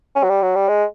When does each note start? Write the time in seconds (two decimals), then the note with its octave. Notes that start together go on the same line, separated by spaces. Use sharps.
0.15 C#4
0.23 F#3
0.29 G3
0.42 F#3
0.55 G3
0.69 G#3